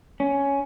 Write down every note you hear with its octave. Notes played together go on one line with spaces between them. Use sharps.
C#4